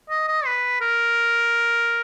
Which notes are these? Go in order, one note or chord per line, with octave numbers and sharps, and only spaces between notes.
D#5
D#5
B4
A#4